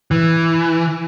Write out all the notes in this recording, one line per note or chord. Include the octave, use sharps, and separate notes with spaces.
E3